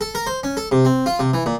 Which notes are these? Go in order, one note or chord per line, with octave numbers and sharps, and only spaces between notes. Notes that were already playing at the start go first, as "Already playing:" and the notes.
A4
A#4
C5
C#4
A4
C3
C4
F4
C3
E3
A#2